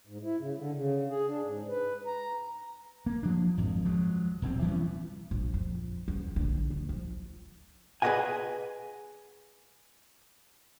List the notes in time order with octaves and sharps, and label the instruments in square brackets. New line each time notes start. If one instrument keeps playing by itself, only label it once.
[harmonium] G#2
E4
C#3
D3
C#3
G#4
D4
G#2
B4
A#5
[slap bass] A#3
F3 D4
G#1 F2
F3 F#3 G#3
D#1 B1 C4
E3 G3 B3 C#4
[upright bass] A#1
F2
E2 C#4
A#1 D3
D2
F3
[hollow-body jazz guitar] G#4 B4 C#5 D#5 F#5 G#5